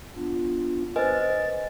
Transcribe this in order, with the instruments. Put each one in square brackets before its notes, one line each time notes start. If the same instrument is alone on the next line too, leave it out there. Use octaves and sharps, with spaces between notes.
[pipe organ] B3 D4 F4
[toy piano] B4 C5 [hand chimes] D#5 G#5 [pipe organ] A6